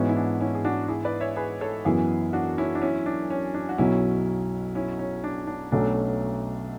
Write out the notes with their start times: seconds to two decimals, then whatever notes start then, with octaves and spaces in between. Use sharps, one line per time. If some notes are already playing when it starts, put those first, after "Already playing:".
Already playing: G#2 E3 B3 C#4 F#4
0.09 E4
0.16 D4
0.40 C#4 E4
0.55 G#4
0.65 D4 F#4
0.88 E4 G#4
1.05 B4 D5
1.20 C#5 E5
1.36 G#4 B4
1.61 A4 C#5
1.85 F#2 E3 B3 E4 G#4
2.33 D4 F#4
2.58 C#4 E4
2.75 D4
2.82 C#4 E4
3.06 D4
3.30 C#4
3.54 D4
3.69 F#4
3.78 B1 B2 F#3 C#4 E4
4.75 C#4 E4
4.99 C#4
5.24 D4
5.47 D4
5.72 B1 B2 F#3 A3 C#4 D4